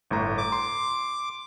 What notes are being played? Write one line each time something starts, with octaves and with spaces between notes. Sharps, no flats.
G1 A2 A#5
D6
C6